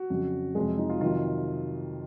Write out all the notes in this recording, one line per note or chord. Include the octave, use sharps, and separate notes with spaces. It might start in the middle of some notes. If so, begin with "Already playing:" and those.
Already playing: F#4
F2 C#3 F#3
F2 C3 F#3 G#3 G#4
D#4
F4
F2 C3 D#3 F#3 F4